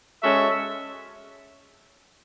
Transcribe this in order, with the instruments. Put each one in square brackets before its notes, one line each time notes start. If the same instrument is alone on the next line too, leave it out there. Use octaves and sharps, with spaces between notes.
[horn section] G#3 C#4 F#4 A4 E5